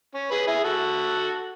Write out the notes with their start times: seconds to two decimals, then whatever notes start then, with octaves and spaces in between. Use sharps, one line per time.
0.14 C#4
0.31 G#4 B4
0.47 E4 G#4
0.64 F#4 A4